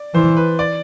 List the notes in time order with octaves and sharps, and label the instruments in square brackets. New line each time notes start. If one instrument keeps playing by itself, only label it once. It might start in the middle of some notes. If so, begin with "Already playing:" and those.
Already playing: [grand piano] D5
[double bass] E3 [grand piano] C5
[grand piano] B4
D5